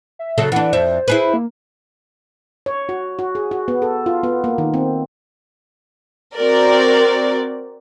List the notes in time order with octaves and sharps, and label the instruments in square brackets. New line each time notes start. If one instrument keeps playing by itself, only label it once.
[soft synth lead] E5
[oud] C#3 F#3 A4
[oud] E3 D4 [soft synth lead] F#5
[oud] F2 E5 [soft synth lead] C5
[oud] E4 G#4 B4
[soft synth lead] A#3
[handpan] C#5
F#4
F#4
G#4
F#4
B3
A4
F4
B3
A#3
D#3
C4
[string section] C4 F#4 A#4 D5